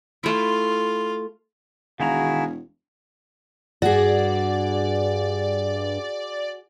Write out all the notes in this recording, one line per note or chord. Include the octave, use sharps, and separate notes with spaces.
A3 E4 F4
E1 D#3 E4 F#4 G#4 F5 A#5
G2 F#4 G#4 D5